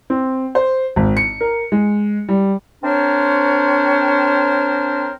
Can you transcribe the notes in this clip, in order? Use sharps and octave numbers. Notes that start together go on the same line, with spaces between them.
C4
C5
G#1
C#7
A#4
G#3
G3
C4 D4 A#4 C5 C#5